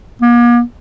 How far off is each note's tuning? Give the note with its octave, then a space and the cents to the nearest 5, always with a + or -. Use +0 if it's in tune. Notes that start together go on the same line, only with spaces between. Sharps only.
A#3 +45